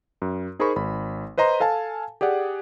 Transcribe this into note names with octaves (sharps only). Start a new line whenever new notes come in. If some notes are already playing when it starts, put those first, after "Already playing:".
F#2
D#4 G#4 A#4 C5 B5 C#6
G#1 B5
B4 C5 D#5 A#5 C6
A4 F5 G#5 A5
G4 G#4 D5 F#5